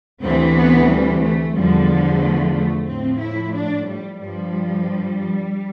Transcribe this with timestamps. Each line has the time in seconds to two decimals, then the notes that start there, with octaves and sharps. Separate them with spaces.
0.22 D2 C3 E3 C4
0.56 B3
0.89 G3
1.22 A3
1.55 E2 D3 F3 G3
2.21 A3
2.54 A3
2.86 A2 C4
2.92 F3
3.20 E4
3.53 D4
3.87 G3
4.19 G2 F3 G3